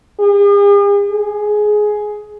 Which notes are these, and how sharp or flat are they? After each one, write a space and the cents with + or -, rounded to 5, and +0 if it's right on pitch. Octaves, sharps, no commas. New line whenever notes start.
G#4 -45
G#4 +10